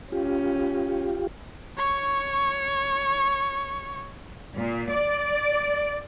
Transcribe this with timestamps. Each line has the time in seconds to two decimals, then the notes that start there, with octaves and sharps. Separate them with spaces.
0.12 C#4 F4 G4
1.78 C#5 C#6
4.57 A#2
4.90 D5